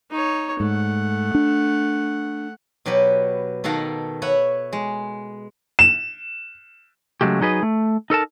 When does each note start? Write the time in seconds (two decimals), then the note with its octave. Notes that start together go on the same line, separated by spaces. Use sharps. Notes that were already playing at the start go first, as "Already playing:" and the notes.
0.11 D#4 C#5
0.60 G#2 A3 F#5
1.35 D4
2.86 B2 F#3 G4 B4
3.64 B2 D#3 A4 F5 F#5 A#5
4.22 B4 C#5 E5 F#5
4.73 G#3
5.79 E7
7.21 C#3 F#3 G#3 A3 G4
7.41 F#3 D#4 G#4 B4 D#5
7.63 A3
8.10 D#4 A4 A#4 A5